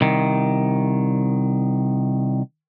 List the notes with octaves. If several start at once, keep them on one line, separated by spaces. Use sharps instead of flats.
C2 D#3